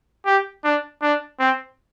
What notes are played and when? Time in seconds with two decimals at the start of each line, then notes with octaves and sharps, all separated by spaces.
0.26 G4
0.64 D4
1.02 D4
1.39 C4